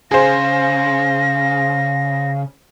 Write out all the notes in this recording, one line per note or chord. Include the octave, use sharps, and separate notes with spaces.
C#3 G#4 C5 F5 A#6